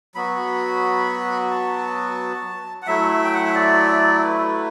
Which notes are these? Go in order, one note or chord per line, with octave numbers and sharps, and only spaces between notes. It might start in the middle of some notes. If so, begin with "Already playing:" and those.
F#3 B3 F#4 B5
A5
F#5
F#3 A3 E4 E5
G5
F#5
E5
D5
B4